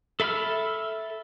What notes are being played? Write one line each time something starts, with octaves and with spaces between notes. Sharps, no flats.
A4 E5 B5 E6 F6